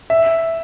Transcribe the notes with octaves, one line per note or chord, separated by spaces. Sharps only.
E5